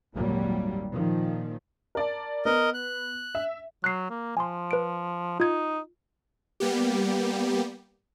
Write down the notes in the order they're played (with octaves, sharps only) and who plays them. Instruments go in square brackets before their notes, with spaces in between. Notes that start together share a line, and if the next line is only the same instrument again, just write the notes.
[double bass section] G#1 D#2 A#2 F#3 G3 A#3
A#2 D#3 F3
[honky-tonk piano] A#4 D5 A5
[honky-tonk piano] B3 [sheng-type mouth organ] A#4 D#5
[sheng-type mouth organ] F#6
[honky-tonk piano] E5
[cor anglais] F#3 [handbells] F#6 C7
[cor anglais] A#3
[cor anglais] F3 [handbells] G#5 C6
[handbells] B4 D7
[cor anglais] D#4 [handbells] F4 G#6
[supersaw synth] G3 A#3 B3 G4